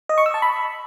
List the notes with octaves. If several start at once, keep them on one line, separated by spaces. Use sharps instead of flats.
D#5
C#6
E6
A5
B5